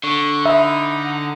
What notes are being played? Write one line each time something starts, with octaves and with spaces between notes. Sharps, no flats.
D3 C#6
D#4 E5 B5
F#5